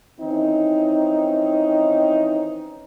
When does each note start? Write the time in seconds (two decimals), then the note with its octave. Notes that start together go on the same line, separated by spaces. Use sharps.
0.20 D#3 E3 C4 C#4 D#4